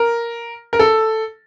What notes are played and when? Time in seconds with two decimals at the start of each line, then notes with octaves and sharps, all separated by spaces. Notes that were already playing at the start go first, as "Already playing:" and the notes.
Already playing: A#4
0.73 A#4
0.79 A4